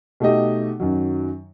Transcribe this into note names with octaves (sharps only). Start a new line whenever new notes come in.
B2 A3 D#4 G4 D#5
F#2 D#3 F#3